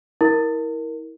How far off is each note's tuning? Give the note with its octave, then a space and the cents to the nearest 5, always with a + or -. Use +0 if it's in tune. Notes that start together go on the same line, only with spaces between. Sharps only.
E4 -30 A#4 +0